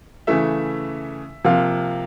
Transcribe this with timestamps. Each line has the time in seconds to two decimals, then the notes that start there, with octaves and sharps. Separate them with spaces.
0.27 C#3 E3 A3 E5
1.45 C3 F3 A#3 F5